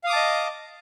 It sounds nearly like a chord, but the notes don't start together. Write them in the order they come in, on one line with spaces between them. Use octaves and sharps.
F5 D#6 D6 A5 D#5